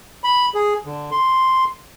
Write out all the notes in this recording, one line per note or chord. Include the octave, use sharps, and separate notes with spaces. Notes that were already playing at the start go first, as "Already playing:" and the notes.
B5
G#4
D3
C6